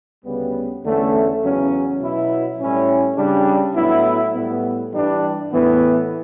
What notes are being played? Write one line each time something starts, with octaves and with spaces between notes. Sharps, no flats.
D2 C#3 G3 B3
E2 D3 A3 C#4
E2 C#3 F#3 C#4
B2 F#3 B3 E4
A2 G3 C#4 E4
C#3 G3 D4
A2 F#3 B3 E4
A2 G3 B3
G2 E3 G3 D4
A2 E3 B3